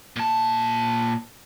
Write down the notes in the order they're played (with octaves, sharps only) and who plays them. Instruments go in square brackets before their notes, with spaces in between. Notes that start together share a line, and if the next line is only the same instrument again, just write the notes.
[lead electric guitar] A#2 A5